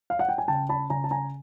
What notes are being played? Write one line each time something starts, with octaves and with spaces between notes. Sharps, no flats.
F5
F#5
G5
G#5
C#3 G5 A5
A5 B5
C#3 G#5 A#5
A5
G#5 A#5